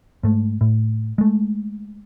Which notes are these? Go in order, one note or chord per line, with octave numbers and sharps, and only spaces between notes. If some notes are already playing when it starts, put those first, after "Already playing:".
G#2 A3
A2
G#3 A3